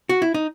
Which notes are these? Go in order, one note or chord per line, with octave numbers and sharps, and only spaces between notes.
F#4
E4
D#4